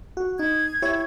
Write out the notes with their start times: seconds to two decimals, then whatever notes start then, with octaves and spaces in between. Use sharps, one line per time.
0.17 F#4
0.39 D#4 G#6
0.82 E4 G4 C#5